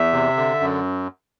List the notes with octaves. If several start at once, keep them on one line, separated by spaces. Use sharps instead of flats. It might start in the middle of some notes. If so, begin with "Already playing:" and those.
Already playing: E2 E5
C3
D3
F#2